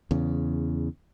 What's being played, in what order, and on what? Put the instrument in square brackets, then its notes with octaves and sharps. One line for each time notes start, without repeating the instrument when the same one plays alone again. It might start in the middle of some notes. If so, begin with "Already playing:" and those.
[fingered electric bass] E2 C#3